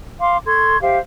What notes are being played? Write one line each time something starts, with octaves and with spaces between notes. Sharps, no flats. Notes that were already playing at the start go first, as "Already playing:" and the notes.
F5 C6 D6
A4 C6 C#6 G#6
G4 C5 E5 F5